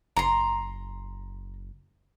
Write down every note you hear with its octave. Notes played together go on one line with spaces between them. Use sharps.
F#1 A#5 C6